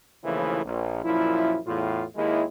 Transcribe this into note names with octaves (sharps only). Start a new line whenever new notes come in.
D#2 C#3 E3 F3 A3 E4
A#1
F#2 A#2 F3 E4
E2 A2 F4
D#2 G#3 E4